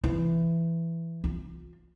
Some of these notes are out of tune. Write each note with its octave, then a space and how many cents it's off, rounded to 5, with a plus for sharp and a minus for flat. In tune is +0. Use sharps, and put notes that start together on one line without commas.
E3 +15
F4 +30